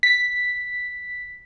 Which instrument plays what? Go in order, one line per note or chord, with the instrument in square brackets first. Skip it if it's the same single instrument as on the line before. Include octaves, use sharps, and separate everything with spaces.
[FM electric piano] B6